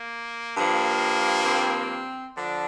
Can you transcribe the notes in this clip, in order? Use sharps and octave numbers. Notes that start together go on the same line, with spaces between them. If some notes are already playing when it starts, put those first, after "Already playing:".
Already playing: A#3
G2 F3 A#3
C4
D3 F3 D4